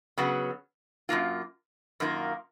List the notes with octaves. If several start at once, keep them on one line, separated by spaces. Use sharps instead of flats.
C#3 F#3 B3
F#2 D#3 A#3 F4
F#2 D#3 A#3 F4